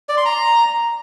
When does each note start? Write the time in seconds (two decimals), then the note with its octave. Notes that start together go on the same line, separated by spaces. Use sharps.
0.09 D5
0.17 C6
0.25 A#5